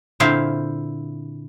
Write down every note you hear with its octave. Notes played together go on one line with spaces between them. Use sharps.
A#2 D3 C4 E4 C5 F5